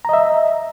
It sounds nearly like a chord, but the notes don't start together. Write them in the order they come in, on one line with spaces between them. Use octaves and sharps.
A#5 D#5 E5